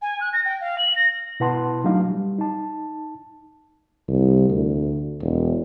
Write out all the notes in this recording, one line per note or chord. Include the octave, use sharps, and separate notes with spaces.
G#5
F#6
A#6
G5
F5
F#7
A#6
B2 E4 B4 F#5 A5 C6
F#3 A3 D4 D#4 F5
G3
D#4 A5
C2
D2
E1